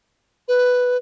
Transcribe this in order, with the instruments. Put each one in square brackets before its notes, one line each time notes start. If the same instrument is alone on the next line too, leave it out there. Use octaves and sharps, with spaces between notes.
[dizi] B4